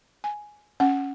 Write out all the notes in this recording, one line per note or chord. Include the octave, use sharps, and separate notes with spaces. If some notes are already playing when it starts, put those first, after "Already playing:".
G#5
C#4 F#5